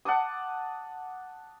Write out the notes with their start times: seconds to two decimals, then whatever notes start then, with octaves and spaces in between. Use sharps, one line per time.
0.05 F#5 A5 D6 D#6